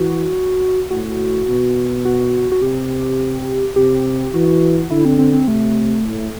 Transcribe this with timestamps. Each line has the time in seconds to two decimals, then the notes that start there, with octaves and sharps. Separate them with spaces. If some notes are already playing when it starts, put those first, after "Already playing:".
Already playing: E3 F#4
0.91 A2 F#4
1.48 B2
2.05 F#4
2.52 F#4
2.62 C3 G4
3.76 C3 G4
4.34 E3 F#4
4.90 D3 E4
5.05 C4
5.18 C4
5.33 C4
5.47 C3 A3
6.04 A2